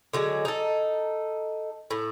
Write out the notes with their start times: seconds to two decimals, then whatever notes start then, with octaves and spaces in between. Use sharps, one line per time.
0.13 D3 F#3 G#3
0.45 D#4 A4
1.91 A2